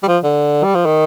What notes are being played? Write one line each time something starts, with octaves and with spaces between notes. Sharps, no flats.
G3
F3
D3
G3
F3
D#3